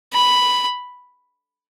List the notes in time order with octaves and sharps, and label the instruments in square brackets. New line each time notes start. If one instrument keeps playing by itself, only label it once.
[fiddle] B5